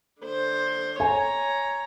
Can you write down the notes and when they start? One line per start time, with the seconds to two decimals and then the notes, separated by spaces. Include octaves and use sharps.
0.21 D3 C5
1.00 C#5 G#5 A#5